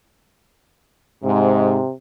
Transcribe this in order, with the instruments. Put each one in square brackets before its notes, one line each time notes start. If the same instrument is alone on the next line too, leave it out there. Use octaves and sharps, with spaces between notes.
[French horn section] G#2 [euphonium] C3